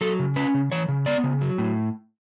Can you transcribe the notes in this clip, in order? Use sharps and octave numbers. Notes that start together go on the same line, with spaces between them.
F#3 A4
C#3
C#4 B4
C#3
E3 C#5
C#3
B3 D5
C#3
F#3
A2